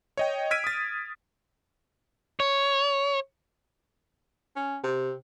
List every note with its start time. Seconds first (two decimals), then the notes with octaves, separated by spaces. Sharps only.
0.17 C#5 D#5 G5
0.51 E6 F6 G#6 B6 D7 D#7
0.64 D#6 A6
2.40 C#5
4.56 C#4
4.83 C3